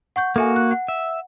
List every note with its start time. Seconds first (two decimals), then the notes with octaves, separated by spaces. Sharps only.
0.16 F#5 C#6 G6
0.36 A#3 F#4 A4 E5 G#5
0.56 F#6
0.71 F#5
0.88 E5